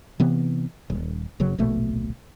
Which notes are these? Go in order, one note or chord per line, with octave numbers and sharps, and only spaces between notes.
C3 E3 B3
D#1
F#1 C#3 F#3
D1 A#1 B2 A3